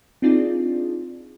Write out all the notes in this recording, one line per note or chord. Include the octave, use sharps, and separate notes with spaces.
C4 D4 D#4 F4 G#4 D5